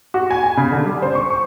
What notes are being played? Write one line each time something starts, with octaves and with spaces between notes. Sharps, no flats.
F#4
G#5
G#5
C#3
D3
G3
C5
C#6
C#6